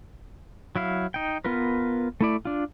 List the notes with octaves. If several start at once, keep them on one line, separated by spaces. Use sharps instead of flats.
F#3 E4 F5
D#4 G5
B3 F4 A#4 B4
A3 E4 D5
D4 F4